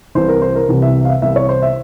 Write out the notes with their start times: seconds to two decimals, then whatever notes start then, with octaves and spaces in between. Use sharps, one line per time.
0.15 C2 C3 E3 C5
0.28 A#4
0.42 C5
0.55 A#4
0.69 C2 C3 E3
0.82 E5
1.05 F5
1.09 E5
1.22 C2 C3 E3 E5
1.36 C#5
1.49 C5
1.62 E5